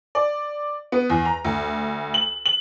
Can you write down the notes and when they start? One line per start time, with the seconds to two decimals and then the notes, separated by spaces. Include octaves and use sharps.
0.15 D5
0.92 B3
1.10 E2
1.25 A#5
1.45 D2
2.14 F#7
2.46 F#7